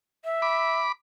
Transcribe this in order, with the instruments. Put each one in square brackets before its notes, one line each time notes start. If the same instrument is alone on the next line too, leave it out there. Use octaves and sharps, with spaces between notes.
[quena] E5
[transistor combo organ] B5 D6